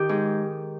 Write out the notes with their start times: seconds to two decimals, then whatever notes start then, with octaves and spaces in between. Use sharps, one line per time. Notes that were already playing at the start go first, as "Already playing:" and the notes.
Already playing: D#3 G4
0.09 G#2